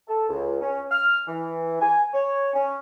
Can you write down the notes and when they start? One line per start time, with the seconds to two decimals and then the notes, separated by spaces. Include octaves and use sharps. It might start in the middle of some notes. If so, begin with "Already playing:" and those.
0.08 A4
0.29 C#2
0.61 C#4
0.92 F6
1.28 E3
1.81 G#5
2.14 C#5
2.53 C#4